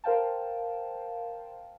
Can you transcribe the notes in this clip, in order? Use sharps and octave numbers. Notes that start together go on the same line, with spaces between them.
A#4 C5 F5 G5 A5